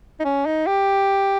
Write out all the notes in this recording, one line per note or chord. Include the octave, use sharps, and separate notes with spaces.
D#4
C#4
D#4
G4